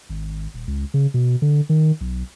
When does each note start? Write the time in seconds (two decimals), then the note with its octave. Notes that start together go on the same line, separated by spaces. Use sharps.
0.10 G#1
0.54 D#1
0.67 C#2
0.94 C#3
1.14 B2
1.42 D3
1.69 D#3
2.01 B1